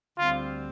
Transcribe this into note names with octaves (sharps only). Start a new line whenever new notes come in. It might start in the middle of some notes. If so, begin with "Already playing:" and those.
D2 D3 G3 C4 F4